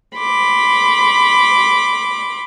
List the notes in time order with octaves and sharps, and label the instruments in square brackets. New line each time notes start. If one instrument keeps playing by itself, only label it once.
[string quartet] B5 C6 D6